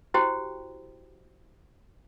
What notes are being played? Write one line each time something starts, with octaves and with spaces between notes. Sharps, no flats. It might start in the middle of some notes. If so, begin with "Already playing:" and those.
E4 F#4 G4 C5 G5